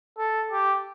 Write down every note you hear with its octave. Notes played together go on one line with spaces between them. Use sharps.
A4
G4